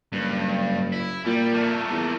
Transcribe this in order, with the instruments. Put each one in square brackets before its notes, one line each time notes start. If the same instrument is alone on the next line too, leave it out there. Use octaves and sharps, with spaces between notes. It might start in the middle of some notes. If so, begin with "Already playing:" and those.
[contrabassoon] F#1 [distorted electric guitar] G2
[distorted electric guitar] E4
[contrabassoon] A#2 [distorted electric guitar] G3
[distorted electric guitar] A3 A#3
[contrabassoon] E2